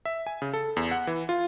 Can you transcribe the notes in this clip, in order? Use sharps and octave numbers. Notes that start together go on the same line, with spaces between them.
E5
G#5
C#3
A4
E2
F#5
E3
F4